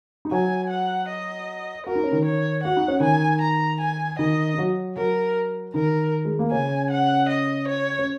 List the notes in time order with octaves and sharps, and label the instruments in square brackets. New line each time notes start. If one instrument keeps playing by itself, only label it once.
[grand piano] D#4
[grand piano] F#3 F#4 [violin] G#5
[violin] F#5
D#5
[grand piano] F#4 [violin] A#4
[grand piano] D#4
C#4
D#3 D#4
[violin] C#5
[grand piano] F#4 [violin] F#5
[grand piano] D#4
C#4
[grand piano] D#3 D#4 [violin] G#5
[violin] A#5
G#5
[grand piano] D#3 D#4 [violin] D#5
[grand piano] D#4
F#3 F#4
[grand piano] F#3 F#4 [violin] A#4
[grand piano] D#3 D#4 [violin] A#4
[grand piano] G#3
A#3
[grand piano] C#3 C#4 [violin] G#5
[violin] F#5
D#5
C#5
[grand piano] C#4